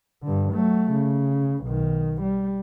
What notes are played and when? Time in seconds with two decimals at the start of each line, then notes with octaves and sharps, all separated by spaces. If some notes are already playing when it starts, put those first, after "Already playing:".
0.23 G2 D3
0.53 F#3 A3
0.92 C#3
1.65 B1 D#3
2.21 G3